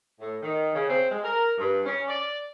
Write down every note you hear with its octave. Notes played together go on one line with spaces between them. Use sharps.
A2
D#3
C#3
C4
G#3
A#4
G2
C#4
D5